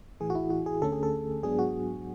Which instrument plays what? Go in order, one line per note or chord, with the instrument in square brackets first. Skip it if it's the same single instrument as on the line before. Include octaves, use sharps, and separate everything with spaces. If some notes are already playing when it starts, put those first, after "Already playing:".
[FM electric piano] A1 A2 E3 G#4
F#4
E4
F#4
G#4
D2 D3 A3 C#4 A4
G#4
A4
G#2 F#3 B3 D4 G#4
F#4